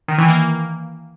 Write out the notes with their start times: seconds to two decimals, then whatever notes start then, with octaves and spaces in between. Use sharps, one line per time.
0.08 D#3
0.18 E3
0.28 A#3